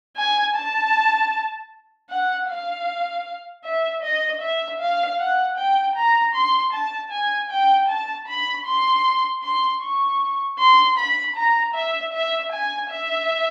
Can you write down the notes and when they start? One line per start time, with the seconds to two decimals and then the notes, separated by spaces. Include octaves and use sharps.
0.17 G#5
0.56 A5
2.10 F#5
2.48 F5
3.64 E5
4.03 D#5
4.41 E5
4.80 F5
5.19 F#5
5.57 G5
5.96 A#5
6.34 C6
6.73 A5
7.11 G#5
7.50 G5
7.88 A5
8.27 B5
8.66 C6
9.43 C6
9.81 C#6
10.59 C6
10.97 B5
11.36 A#5
11.74 E5
12.13 E5
12.52 G#5
12.90 E5